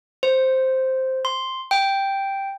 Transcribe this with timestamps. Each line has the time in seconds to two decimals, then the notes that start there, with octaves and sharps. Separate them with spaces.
0.23 C5
1.25 C6
1.71 G5